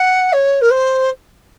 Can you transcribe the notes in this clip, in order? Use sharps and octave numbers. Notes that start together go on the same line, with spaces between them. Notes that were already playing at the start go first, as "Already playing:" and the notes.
Already playing: F#5
C#5
A#4
C5